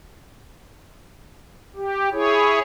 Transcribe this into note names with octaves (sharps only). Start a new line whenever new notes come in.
G4
E4 G#4 C#5